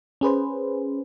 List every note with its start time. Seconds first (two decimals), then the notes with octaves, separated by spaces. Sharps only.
0.21 C#4 G#4 B4 C5